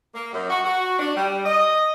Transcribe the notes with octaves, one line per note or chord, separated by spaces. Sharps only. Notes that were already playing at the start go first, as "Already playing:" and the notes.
A#3
F#2
F#4
F#4
D4
G3
D#5